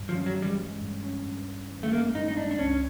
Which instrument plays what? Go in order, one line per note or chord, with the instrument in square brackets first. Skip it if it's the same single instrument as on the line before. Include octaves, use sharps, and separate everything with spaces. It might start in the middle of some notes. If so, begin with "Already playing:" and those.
Already playing: [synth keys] G2
[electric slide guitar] F3
[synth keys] C#4
[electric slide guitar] F#3
[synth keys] E3
[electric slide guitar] G3
[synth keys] G#3
G2
C#4
G2
G2
E3
[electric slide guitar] A3
[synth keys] G#3 [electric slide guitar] A#3
[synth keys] G2 [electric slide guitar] D#4
[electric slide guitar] D#4
[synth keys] G2 [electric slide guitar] D4
[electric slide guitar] D4
[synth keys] C#2 [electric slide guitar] C#4